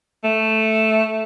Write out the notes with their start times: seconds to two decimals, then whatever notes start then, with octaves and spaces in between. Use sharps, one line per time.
0.24 A3